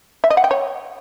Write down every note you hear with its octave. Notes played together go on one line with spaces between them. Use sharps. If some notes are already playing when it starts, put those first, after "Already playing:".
E5
D#5
F#5
G5
C#5